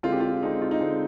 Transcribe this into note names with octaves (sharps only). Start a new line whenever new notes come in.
D3 G#3 C4 F4
G4
F4
D3 G#3 C4 D#4
F4
D#4
D3 G#3 C4